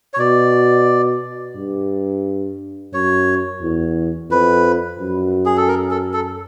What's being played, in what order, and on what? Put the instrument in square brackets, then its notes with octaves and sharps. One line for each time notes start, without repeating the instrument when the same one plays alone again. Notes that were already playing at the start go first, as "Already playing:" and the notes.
[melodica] C#5
[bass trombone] B2 [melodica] D5
[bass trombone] G2
[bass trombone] F#2 [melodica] C#5
[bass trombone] E2
[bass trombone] F2 [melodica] B4
[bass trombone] F#2
[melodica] G#4
A4
A#4
A4
A4